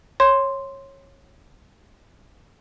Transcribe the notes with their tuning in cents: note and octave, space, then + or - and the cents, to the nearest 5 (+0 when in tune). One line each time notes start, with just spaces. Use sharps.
C#5 -20 C6 +0